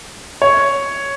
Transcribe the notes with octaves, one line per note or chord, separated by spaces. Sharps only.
C#5